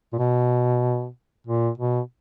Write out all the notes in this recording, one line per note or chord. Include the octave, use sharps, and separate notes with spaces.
A#2
B2
A#2
B2